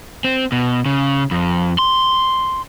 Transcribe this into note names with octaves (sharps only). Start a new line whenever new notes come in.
C4
B2
C#3
F2
C6